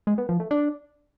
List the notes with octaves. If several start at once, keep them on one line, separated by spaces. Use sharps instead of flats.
G#3
B3
F3
A3
D4